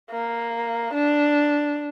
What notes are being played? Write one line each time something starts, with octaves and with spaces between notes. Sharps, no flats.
A#3
D4